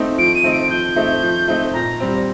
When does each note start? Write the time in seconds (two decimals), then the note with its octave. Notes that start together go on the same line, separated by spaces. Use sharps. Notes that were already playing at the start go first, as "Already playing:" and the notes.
Already playing: A3 C4 D#4
0.18 F3 D7
0.35 D#7
0.44 A3 C4 D#4
0.52 D7
0.70 F3 G6
0.96 A3 C4 D#4
1.22 F3
1.48 A3 C4 D#4
1.73 A#2 A#5
2.00 G3 C4